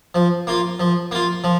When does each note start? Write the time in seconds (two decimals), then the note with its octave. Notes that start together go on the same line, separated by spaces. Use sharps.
0.15 F3
0.47 A#3 F4
0.80 F3
1.11 A#3 F4
1.44 F3